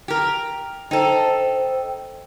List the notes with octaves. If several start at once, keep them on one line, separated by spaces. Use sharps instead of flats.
G4 A#4
D#4 A4 C5 G5